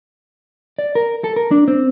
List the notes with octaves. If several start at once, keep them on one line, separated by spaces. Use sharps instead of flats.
D5
A#4
A4
A#4
D4
C4